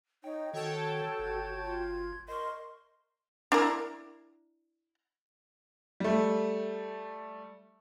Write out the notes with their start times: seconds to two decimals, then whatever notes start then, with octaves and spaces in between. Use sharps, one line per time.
0.24 D#4 C#5 G5
0.54 D#3 F#4 A4 C#5 G5 A5
1.19 G1 G#6
1.62 F4
2.28 A#4 D#5 C6 C#6
3.52 D4 E4 A#4
6.00 G3 A3